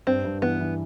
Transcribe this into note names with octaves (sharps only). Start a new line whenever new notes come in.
G2 C4
G2
E3 B3
E3